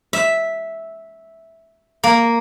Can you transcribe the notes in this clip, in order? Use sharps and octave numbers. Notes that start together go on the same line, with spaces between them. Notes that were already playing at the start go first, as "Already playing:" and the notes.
E5
A#3